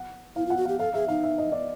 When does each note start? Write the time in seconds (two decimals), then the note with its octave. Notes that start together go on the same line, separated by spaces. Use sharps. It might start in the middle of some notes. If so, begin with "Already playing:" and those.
Already playing: F#5
0.36 E4 F5
0.46 F4
0.50 F#5
0.57 F#4
0.65 G4 F5
0.79 A4 F5
0.94 G#4 E5
1.08 D#4 F5
1.23 E5
1.38 D#5
1.52 D5